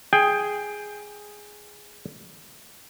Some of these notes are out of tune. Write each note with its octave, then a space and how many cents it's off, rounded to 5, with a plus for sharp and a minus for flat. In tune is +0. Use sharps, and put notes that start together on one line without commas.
G#4 +0 G5 +15